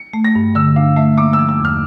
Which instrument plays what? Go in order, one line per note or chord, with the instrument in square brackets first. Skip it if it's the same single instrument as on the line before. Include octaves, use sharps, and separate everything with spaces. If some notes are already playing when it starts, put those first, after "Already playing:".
Already playing: [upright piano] C#7
[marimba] A3
[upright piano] A#6
[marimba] G2
[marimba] D3 [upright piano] E6
[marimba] D4 [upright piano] F5
[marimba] A3 [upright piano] E5
[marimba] A#3 [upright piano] D6
[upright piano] E6
[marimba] F3
[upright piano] E6
[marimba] E2
[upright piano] F6